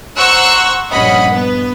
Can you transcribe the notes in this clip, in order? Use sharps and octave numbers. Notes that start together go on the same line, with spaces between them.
C5 F#5 A#5 C#6 E6 F#6
A#1 G2 C#4 D#5 F#5 B5
B3 B4